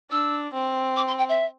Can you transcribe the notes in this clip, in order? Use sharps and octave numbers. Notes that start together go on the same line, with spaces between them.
D4 E6
C4
D6
C6
G5
E5